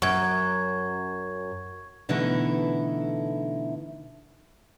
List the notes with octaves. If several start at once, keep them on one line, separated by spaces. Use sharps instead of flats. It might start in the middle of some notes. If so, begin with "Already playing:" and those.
F#2 C#6 G#6
B2 D3 E3 A3 D#4 E4